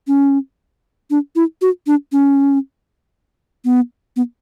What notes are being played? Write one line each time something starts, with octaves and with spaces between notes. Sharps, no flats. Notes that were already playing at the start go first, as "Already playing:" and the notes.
C#4
D4
E4
F#4
D4
C#4
B3
B3